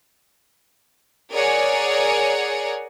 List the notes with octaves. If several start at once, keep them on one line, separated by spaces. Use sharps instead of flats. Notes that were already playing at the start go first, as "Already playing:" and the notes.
G#4 A#4 C#5 D5 F#5 G#5